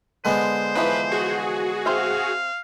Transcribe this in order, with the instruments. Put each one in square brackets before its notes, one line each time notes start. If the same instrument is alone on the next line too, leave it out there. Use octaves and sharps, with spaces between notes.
[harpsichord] D3 G#3 B3 [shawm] C5
[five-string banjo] E3 F3 D#4 [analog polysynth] B4
[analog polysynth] F#4 G#4
[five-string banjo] C4 C5 E5 [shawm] F5